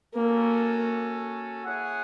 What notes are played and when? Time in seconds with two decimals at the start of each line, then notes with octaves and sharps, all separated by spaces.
0.14 A#3 C#4 F#4 A4
1.64 E4 G#4 C#5 F#5